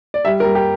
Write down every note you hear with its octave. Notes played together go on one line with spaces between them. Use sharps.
D5
G3 E5
A#4
G3
G4